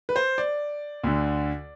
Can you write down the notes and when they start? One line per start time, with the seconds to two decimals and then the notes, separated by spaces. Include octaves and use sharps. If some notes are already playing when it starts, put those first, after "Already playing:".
0.09 B4
0.16 C5
0.38 D5
1.03 D2 D3